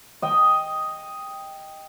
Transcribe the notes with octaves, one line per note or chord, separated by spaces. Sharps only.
D#5 G5